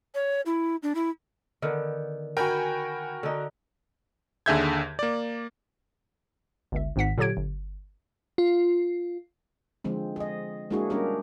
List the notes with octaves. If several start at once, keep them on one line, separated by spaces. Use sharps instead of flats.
C#5
E4
D4
E4
D3 D#3 B3
F#4 A#4 G5 G#5 B5
D3 D#4
D#2 D3 G#4 E5 G6 G#6
A#3 D5
G1 C#2 E5
G#1 G#2 F#5 B6
A#2 D3 F#3 G4 G#6 D7
G1
F4
D3 F3 G#3 C4
G#4 D#5
G#3 A#3 D4 E4 F#4 G#4
G3 A#3 C#4 D4 G4 A#4